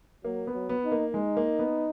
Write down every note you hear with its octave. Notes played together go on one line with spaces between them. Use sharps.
F#3 A#3
B3
F#3
B3
D#4
A#3
G#3 D#4
A#3
B3